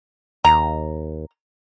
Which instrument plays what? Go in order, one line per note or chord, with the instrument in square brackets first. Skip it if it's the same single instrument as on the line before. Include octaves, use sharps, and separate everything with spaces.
[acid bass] D#2 [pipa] A#5